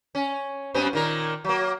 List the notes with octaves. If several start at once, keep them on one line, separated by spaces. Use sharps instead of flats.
C#4
F#2 B3 C4
A#2 D#3 A#4
F#3 A#3